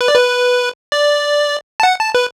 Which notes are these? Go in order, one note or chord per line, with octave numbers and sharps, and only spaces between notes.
B4
D5
B4
D5
A5
F#5
A5
B4